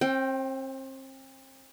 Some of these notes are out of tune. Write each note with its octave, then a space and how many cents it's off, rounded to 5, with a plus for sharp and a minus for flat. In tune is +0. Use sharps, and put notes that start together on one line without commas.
C4 +35 G5 +0